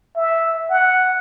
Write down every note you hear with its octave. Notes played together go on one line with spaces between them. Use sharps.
E5
F#5